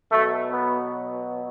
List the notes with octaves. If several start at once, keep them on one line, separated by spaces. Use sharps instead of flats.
B2 F#3 A3
B3